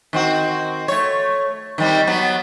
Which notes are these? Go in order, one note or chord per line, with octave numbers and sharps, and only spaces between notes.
D#3 C4 F#4
A3 C#5
D#3 G3 C4
F#3 B3